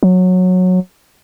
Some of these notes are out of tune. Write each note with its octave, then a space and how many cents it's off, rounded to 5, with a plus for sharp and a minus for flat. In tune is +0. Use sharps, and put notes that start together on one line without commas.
F#3 -15